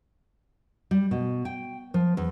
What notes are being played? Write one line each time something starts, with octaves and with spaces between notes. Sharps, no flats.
G3
B2
G5
F3
E2